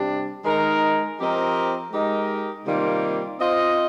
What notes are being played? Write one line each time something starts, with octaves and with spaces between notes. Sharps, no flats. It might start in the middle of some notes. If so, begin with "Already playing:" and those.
Already playing: C3 G3 D4 G4
D#3 G#3 D#4 A#4
F3 C4 G4 A#4 D#5
G#3 D#4 G4 A#4 D#5
C3 D#3 G3 A#3 F4
C4 F4 C5 D#5